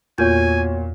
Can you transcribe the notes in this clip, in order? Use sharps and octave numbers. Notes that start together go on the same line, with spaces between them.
E2 A#2 B3 F#4 C#5 G#5 G6